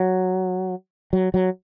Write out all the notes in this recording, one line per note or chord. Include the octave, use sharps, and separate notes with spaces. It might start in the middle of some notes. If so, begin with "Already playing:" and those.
Already playing: F#3
F#3
F#3